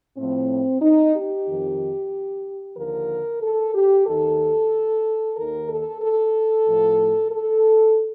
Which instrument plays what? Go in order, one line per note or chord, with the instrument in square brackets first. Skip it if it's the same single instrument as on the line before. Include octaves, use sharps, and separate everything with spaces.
[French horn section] A2 F3 C4
D#4
G4
F2 D#3
D#2 D3 F3 A#4
A4
G4
D#2 D#3 A4
D#2 D#3 A#4
A4
A4
A2 F3
A4